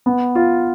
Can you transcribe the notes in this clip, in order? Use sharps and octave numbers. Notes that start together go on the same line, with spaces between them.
B3
F4